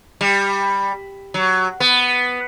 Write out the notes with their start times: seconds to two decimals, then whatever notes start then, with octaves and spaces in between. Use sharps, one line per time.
0.21 G3
1.34 F#3
1.80 B3